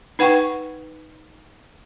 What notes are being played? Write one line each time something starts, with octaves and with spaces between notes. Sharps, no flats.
D#4 B4 F#5 G5 C#6